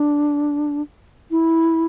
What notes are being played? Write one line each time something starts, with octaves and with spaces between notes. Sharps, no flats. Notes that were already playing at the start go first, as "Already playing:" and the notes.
Already playing: D4
E4